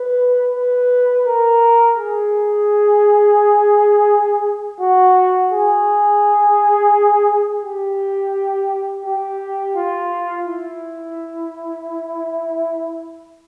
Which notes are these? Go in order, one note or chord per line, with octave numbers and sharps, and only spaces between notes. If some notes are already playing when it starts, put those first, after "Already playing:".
Already playing: B4
B4
A#4
G#4
F#4
G#4
G4
G4
F4
E4